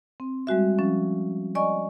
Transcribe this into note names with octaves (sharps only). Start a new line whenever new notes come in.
C4
G3 G#3 F#4 E5
F3 C#4
D5 D#5 G#5 C#6